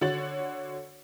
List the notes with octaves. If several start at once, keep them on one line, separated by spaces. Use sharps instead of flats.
D3 F#4 C#5 A6 F#7